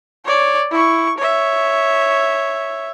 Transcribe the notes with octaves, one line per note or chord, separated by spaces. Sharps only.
C#5 D5
E4 C#6
C#5 E5